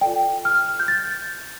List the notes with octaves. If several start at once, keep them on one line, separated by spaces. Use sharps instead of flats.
F4 A4 D5 G5
F6
G6
A6